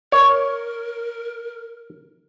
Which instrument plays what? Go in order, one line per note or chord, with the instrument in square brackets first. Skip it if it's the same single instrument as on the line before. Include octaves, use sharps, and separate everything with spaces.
[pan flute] A#4 [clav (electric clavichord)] C#5